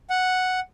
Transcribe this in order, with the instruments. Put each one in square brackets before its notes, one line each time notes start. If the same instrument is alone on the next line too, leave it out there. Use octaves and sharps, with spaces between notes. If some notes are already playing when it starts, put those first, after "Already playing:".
[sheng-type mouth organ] F#5